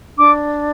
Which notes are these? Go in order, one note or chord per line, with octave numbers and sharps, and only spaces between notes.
D4 D6